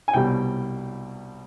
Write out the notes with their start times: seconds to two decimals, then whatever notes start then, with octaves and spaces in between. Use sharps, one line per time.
0.08 G#5
0.13 C2 B2 G3 G5